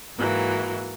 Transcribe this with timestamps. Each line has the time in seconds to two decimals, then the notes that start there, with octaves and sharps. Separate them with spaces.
0.17 G#2 E3 F#3 A#3